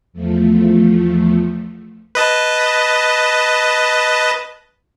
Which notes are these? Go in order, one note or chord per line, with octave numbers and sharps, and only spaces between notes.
E2 F3 A3
B4 D#5 A5